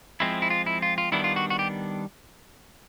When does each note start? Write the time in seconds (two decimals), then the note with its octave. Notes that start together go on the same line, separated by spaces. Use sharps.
0.20 F3 G#3 C4 E4
0.42 E4
0.50 F4
0.66 E4
0.82 F4
0.98 F4
1.12 D#3 G3 B3 D4 E4
1.24 F4
1.36 F#4
1.50 F#4
1.59 G4